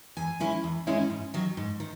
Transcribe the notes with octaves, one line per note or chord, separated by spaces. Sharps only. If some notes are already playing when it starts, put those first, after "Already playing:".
E2 G#5
D#3 G#3 C#4 E4
E2
D#3 G#3 C#4 E4
G#2
D#3 F#3
G#2
D#3